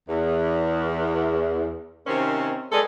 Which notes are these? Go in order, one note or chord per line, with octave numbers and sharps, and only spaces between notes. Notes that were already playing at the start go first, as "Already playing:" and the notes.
E2
C3 D#3 A#3 C4 C#4
G3 G#3 B3 D4 G#4 A4